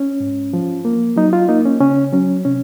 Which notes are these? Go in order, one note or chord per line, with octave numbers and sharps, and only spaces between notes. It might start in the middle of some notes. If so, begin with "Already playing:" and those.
Already playing: C#4
G#2
F3
A#3
F#3 D#4
F4
A#3 D#4
C#4
C#3 C#4
F#3 C#4
C3 C#4